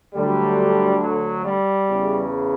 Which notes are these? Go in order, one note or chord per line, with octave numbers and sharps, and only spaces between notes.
D2 D3 F#3 G3
F#3
G3
E2 C#3 E3